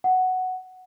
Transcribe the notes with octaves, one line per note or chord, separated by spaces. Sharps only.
F#5